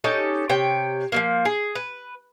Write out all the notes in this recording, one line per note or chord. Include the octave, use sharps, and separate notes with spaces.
C#4 D#4 G4 A4
C3 C#5 G5
F3 F#3 A#3
G#4
B4